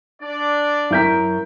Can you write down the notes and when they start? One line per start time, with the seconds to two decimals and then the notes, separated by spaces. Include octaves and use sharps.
0.21 D4 D5
0.91 F#2 E4 A#4 G6 B6